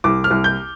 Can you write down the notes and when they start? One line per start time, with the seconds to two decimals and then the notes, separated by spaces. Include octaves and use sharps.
0.04 C2 D6
0.24 F6
0.31 C2
0.44 G6